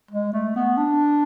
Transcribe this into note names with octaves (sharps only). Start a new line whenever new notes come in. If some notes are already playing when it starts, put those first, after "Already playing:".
G#3
A3
B3
D4